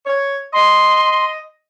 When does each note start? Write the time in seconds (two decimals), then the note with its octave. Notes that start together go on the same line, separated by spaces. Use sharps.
0.06 C#5
0.53 D#5 C6